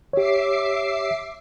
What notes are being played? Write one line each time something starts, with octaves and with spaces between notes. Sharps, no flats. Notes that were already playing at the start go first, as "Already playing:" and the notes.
G4 C#5 E5 D6 C7